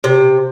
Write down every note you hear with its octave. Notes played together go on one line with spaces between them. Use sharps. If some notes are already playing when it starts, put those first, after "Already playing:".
C3